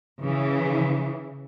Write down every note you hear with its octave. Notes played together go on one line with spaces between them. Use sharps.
C#3 E3